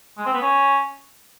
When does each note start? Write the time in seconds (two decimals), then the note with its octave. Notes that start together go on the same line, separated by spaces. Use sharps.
0.18 G#3
0.26 C4
0.34 B3
0.42 C#4